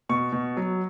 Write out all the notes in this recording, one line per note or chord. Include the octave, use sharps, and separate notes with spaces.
B2 C#6
B2
F#3